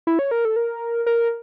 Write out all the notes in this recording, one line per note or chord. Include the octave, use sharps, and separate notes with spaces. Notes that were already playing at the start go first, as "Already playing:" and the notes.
E4
C#5
A#4
A4
A#4
A#4